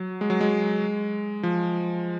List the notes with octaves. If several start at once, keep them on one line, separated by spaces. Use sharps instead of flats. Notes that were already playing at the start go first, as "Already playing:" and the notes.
Already playing: F#3
G#3
F#3
G#3
F3